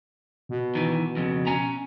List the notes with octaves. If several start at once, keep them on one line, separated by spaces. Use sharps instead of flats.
B2
D#3 E3
F2 C#3
C#4 G#5 A#5